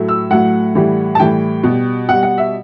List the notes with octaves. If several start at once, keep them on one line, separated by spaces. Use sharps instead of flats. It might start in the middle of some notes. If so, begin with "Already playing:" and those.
Already playing: A2 F#3 A3
E6
A2 F#3 A3 F#5
A2 E3 G3
A5
A2 E3 G3 G5
B2
G3
B2 G3 F#5
F#5
E5